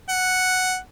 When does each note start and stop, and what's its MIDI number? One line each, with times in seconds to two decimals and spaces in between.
0.09 0.77 78